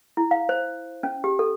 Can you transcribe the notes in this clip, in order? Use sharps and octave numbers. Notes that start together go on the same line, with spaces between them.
E4
F5
C5
C#4
G4
A4